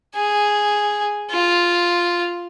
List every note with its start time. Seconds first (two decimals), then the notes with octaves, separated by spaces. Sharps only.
0.15 G#4
1.31 F4